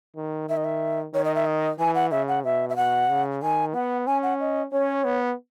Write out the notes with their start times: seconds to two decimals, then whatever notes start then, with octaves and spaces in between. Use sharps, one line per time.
0.16 D#3
0.48 D#3 E5
0.57 D#5
0.64 E5
1.13 D#3 C#5
1.25 D#5
1.35 E5
1.46 D#5
1.79 E3 G#5
1.95 F#5
2.11 C#3 E5
2.28 F#5
2.44 B2 E5
2.69 E5
2.76 B2 F#5
3.10 C#3
3.42 D#3 G#5
3.74 B3 F#5
4.07 C#4 G#5
4.23 F#5
4.40 D#5
4.72 C#4 C#5
5.04 B3